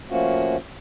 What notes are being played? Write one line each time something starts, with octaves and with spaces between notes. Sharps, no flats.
F3 A3 A#3 C#4 F4 F#4